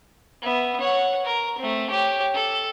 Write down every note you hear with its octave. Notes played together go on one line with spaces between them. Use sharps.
B3 E5
C#5 F#5
A#4
A3 C4
G4 C#5
A4